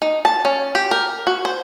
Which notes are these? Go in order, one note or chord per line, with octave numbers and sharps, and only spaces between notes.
D#4
A5
C#4
G4
A#4
F#4
C5